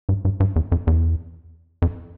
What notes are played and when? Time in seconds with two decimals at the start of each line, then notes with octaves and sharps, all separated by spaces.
0.09 G2
0.25 G2
0.40 G2
0.56 E2
0.72 F2
0.87 E2
1.82 F2